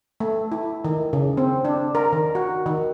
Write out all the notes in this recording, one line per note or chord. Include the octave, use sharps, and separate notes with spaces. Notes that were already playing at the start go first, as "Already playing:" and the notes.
A3
E4
D#3
C#3
C4
D4
A#4
D#3
F#4
D#3